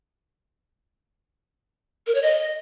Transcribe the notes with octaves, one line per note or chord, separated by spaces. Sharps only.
A#4
C#5
D#5